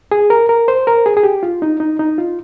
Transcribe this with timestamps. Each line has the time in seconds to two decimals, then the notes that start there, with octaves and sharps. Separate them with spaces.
0.11 G#4
0.30 A#4
0.49 A#4
0.68 C5
0.87 A#4
1.06 G#4
1.17 G#4
1.23 G4
1.43 F4
1.62 D#4
1.80 D#4
1.99 D#4
2.18 F4